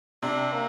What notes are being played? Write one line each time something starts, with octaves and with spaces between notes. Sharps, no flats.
C3 D4
A#3